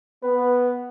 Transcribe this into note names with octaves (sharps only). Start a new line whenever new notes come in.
B3 B4